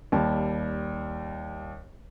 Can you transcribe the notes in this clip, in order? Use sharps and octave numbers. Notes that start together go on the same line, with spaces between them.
D#2 G3 A5